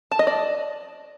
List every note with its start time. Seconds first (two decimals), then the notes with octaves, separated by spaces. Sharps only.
0.11 A5
0.19 D#5
0.27 D5